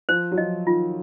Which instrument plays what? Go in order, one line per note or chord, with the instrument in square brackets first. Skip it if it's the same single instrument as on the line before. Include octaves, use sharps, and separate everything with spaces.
[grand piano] F3 [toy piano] C5
[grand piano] F#3
[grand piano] F3 [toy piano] D#5
[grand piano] D#3 [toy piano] F4